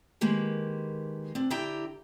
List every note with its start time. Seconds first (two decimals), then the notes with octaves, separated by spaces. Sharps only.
0.21 D#3 G#3 A#3 G4 B4
1.35 C4 D4
1.50 D3 E4 G4 G5 A#5